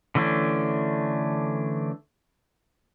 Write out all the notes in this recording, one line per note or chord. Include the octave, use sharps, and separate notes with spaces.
D3 E3 A3 C#4 D4